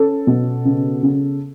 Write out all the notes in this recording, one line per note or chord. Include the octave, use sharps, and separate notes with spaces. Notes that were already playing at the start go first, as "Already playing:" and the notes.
Already playing: C#4 A4
B2
C#3
C#3